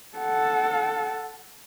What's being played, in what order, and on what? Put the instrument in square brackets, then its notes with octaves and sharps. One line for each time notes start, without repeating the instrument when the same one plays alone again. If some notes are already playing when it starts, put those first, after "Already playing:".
[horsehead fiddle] A4 F#5